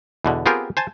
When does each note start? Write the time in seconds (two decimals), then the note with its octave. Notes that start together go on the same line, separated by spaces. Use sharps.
0.25 E2 B2 D3
0.46 B3 C4 F4 G4 G#4 A#4
0.77 C5 G#5 A5